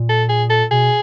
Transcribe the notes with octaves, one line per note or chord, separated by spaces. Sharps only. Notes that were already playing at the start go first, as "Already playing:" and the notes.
Already playing: A#2
A4
G#4
A4
B2 G#4